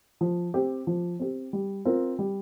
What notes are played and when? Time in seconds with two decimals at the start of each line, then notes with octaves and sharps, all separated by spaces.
0.21 F3
0.54 C4 G4
0.87 F3
1.20 C4 G4
1.53 G3
1.85 C4 F4 A#4
2.19 G3